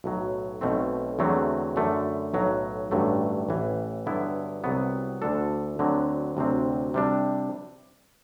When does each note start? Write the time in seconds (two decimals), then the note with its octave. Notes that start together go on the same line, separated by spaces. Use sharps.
0.04 B1 A2 F#3
0.61 B1 B2 A3 C4
1.19 E2 D3 F#3 A3 C4
1.76 F#2 D3 A3
2.34 B1 A2 F#3
2.91 A1 G2 D3 F#3 A3
3.49 A1 A2 E3
4.06 G2 D3 F#3 B3 E4
4.64 C2 C3 F#3 B3
5.22 D2 D3 A3 D4 A4
5.79 D2 D3 F#3 C4
6.37 D2 C3 F#3 C4
6.94 C3 G3 D4